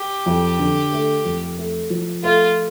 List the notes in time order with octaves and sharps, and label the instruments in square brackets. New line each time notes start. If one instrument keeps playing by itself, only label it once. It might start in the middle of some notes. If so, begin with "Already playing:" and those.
Already playing: [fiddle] G4
[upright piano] F2
D3
A3
F2
A3
F3
[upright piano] A3 [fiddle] F4